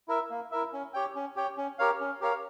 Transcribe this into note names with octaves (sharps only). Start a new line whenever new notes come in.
E4 A#4 E5
A#3
E4 A#4 E5
C#4
G4 C#5 G5
C#4
G4 C#5 G5
C#4
G4 A#4 C#5 F5
C#4
G4 A#4 C#5 F5